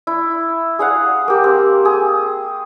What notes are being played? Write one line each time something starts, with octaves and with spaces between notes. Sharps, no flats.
E4
G#4 F5 F#5
A#3 G4
C4
G#4